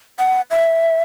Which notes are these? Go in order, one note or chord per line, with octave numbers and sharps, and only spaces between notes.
F#5
E5